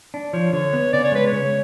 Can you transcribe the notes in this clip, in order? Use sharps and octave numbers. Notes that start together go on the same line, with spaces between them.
D4
F3 C#5
D3 C#5
B3
C#3 D5
C#5
G#3 B4
C#5
C#3